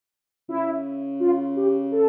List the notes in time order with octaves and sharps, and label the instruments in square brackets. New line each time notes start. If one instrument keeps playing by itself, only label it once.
[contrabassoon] C#3 [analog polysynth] E4
[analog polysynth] F4
G4
A4